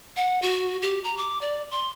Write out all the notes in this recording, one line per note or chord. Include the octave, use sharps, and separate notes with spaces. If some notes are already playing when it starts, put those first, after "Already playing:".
F#5
F#4
G4
A#5
D6
D5
C6